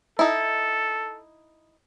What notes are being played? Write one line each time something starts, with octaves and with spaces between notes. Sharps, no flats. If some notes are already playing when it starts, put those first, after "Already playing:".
D#4 E4 A4